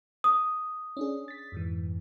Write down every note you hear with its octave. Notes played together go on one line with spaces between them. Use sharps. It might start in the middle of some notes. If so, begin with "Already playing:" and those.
D#6
C#4 D4 G#4
A6 B6
F2 G#2 E3